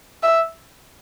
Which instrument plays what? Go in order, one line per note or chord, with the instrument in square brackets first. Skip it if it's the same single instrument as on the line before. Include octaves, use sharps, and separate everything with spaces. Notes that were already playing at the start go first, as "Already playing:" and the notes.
[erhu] E5